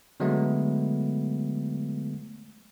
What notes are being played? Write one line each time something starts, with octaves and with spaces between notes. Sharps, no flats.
D3 F#3 G#3 A3 B3